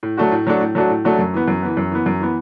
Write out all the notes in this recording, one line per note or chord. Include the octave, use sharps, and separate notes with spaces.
A2
F#3 A3 D4 F#4
A2
F#3 A3 D4 F#4
A2
F#3 A3 D4 F#4
A2
F#3 A3 D4 F#4
F#2
E3 B3
F#2
E3 B3
F#2
E3 B3
F#2
E3 B3